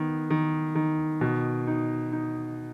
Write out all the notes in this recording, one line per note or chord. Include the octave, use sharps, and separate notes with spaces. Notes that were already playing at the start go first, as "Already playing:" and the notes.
Already playing: D#3 B3
D#3
D#3
B2
D#4
D#4